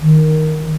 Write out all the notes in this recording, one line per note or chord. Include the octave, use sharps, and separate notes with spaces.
D#3